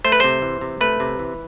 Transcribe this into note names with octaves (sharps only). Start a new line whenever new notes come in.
A3 C5
B4
C3 C5
E3
C3
A3 B4
C3
E3